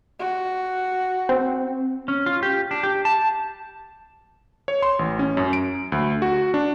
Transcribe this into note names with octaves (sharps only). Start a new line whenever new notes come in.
F#4
C4
C#4
F4
G4
D4
G4
A5
C#5
C6
A1
C#4
F#2
D7
D2
F#4
D4